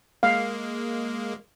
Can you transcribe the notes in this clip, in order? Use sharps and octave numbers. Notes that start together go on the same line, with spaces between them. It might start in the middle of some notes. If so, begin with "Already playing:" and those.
G#3 A#3 F5